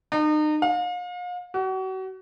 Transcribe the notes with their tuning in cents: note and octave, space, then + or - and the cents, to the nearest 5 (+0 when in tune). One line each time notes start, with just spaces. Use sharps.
D#4 -35
F5 +40
F#4 +35